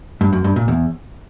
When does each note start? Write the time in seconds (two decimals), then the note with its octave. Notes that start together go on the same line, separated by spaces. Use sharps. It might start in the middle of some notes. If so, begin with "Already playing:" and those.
0.21 G2
0.33 F#2
0.44 G2
0.56 A#2
0.68 E2